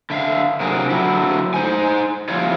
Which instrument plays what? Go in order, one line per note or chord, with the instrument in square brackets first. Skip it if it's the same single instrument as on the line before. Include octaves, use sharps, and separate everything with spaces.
[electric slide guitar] D3 E5 F5
C3 F#3 D4 G#4 A#4
D3 F#3 E4
D#4 C5 G#5
F3 G3 C4 E4 F4 C#5